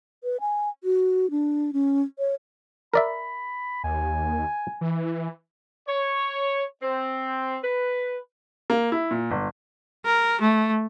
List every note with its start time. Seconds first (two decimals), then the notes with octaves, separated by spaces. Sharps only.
0.24 B4
0.40 G#5
0.84 F#4
1.31 D4
1.73 C#4
2.19 C#5
2.94 A#4 D5 E5 B5
3.84 D#2 G#5
4.81 E3
5.88 C#5
6.82 C4
7.63 B4
8.70 A#3
8.92 E4
9.11 A#2
9.31 G1
10.05 A#4
10.41 A3